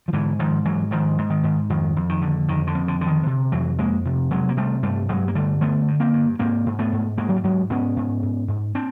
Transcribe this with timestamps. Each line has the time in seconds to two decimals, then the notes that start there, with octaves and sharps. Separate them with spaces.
0.08 F3
0.13 G#2 D3 E3
0.39 G#2 D#3 F3
0.65 G#2 E3 F#3
0.91 G#2 D#3 F3
1.18 G#2
1.30 D#3
1.44 G#2
1.70 F2 D#3
1.96 F2
2.09 D#3
2.22 D3
2.48 F2 D#3
2.67 D3
2.75 F2
2.88 D3
3.01 D3
3.07 D#3
3.26 C3
3.52 F2 E3 F#3
3.79 F2 G#3 A#3
4.05 C3
4.31 C3 F#3 G#3
4.49 A#3
4.57 C3 G3 A3
4.83 G2 G3 A3
5.09 G2 F#3 G#3
5.28 A#3
5.35 D3 G3 A3
5.61 D3 A3 B3
5.88 G2
6.00 A#3 C4
6.13 G2
6.39 G#2 A#3 C4
6.66 G#2
6.79 A3 B3
6.92 G#2
7.17 G#2 G#3 A#3
7.29 F#3
7.36 G3
7.44 G#2 F#3 G#3
7.70 G#2 B3 C#4
7.97 G#2
8.23 G#2
8.48 G#2
8.75 C4 D4